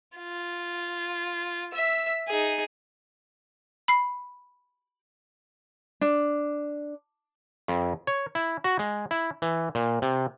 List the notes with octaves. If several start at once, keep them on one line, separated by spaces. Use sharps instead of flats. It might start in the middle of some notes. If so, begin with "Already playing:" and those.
F4
E5 E6
D#4 G#4
B5 C7
D4
F2
C#5
E4
F#4
G#3
E4
E3
A#2
C3